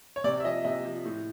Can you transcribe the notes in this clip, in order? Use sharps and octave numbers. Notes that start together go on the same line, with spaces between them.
C#5
C3 D5
E5
F3 D#5
C3 D#5
F3
A2